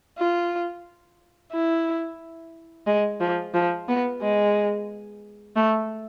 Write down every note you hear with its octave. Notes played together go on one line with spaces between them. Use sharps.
F4
E4
G#3
F3
F3
B3
G#3
A3